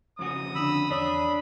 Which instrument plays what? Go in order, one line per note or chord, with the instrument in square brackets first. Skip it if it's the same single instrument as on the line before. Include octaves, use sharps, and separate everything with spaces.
[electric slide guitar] F2 C#3 F#4 [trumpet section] D#6
[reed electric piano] D3 D4 [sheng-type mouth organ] B5 E6
[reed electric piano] E2 C#5 [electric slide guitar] D4 [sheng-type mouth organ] B5